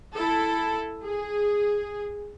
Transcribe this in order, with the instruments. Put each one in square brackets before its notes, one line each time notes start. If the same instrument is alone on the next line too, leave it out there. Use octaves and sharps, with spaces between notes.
[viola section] E4 A4
G#4